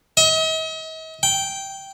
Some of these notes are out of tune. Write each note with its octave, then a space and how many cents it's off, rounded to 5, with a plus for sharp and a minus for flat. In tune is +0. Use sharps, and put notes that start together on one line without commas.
D#5 +45
G5 -5